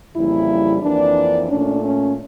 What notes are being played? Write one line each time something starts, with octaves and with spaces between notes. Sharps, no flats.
F2 C#3 E3 G3 A#3 E4
F2 E3 A#3 D4
A#2 A3 C#4 D4
C#4